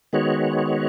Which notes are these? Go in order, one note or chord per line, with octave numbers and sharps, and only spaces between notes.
D#3 G#3 B3 F#4 C#5